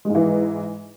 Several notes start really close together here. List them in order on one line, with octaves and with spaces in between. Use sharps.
G#3 G#2 E3